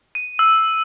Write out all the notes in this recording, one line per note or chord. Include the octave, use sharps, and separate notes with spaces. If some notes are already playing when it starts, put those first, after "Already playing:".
D#7
E6